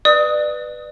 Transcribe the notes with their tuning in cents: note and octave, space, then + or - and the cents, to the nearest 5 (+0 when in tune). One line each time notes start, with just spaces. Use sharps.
B4 +0 D5 +30 D#6 +15